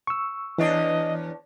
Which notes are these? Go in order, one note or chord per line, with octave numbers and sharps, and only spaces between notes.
C#6 E6
E2 E3 D4 C#5 D#5